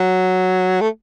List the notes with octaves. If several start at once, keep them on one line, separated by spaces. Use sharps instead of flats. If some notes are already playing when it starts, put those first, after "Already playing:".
Already playing: F#3
A3